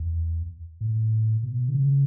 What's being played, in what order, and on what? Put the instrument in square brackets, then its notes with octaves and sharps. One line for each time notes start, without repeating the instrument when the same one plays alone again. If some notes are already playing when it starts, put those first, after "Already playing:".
Already playing: [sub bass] E2
A2
B2
D3
C#3